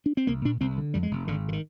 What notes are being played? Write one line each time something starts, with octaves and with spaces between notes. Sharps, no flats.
D4
C4
C2 A#3
A#2 D4
C2 C4
D3
F2 G3
G#3
F1
G#1 D3
D3
D#3